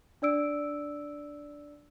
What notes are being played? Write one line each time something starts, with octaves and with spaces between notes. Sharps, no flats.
D4 D5 E6 D7